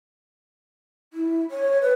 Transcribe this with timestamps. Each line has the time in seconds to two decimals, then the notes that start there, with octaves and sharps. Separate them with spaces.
1.13 E4
1.50 C#5
1.81 B4